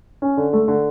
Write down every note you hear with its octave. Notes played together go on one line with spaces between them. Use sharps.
C#4
D3
A3
D3